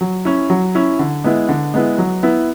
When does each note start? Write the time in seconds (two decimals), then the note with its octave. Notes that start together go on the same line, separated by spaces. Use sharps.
0.01 F#3
0.25 C#4 E4
0.50 F#3
0.75 C#4 E4
0.99 D3
1.24 G#3 B3 E4
1.49 D3
1.74 G#3 B3 E4
1.98 F#3
2.23 B3 E4